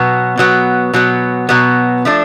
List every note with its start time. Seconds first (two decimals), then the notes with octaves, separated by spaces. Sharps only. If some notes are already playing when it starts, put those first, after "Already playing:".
Already playing: B2 F#3 B3
0.37 B2 F#3 B3
0.93 B2 F#3 B3
1.49 B2 F#3 B3
2.05 F3 A3 D4